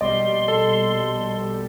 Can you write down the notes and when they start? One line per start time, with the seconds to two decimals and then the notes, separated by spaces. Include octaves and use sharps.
0.01 A#1 B2 G3 D5 D#5 C6
0.48 A4